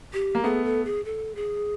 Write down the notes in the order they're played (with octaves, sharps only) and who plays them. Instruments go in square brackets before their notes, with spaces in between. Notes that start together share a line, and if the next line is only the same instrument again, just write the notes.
[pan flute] G4
[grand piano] A#3
[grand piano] A3 B3 [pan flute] G#4
[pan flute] A4
G#4
A4
G#4